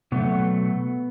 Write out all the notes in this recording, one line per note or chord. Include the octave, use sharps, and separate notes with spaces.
B2 F#3 A3 B3